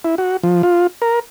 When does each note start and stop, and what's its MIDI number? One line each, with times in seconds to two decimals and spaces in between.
0.05 0.15 64
0.18 0.37 66
0.43 0.62 53
0.63 0.87 65
1.02 1.19 70